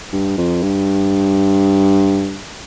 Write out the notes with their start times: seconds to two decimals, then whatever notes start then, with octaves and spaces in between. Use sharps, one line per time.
0.13 G2
0.38 F2
0.62 G2